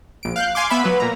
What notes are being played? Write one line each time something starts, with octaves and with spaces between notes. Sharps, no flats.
A#1 D7
F5 F#6 G6
F5 G#5 C6 D6
B3 E5 B5
F#3 B4
A#2 A#5